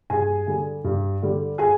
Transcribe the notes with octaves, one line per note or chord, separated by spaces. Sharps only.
G2 G#4 G#5
D3 G3
G2
D3 G3
G#4 G#5